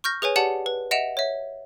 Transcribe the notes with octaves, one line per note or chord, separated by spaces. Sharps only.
C#6 F6 G6 A#6
G#4 B4 C#5 G#5
G4 D5 F#5 A5 C#7 F#7
B4
D#5 E5 F#5 D7 E7 F7
C#5 E5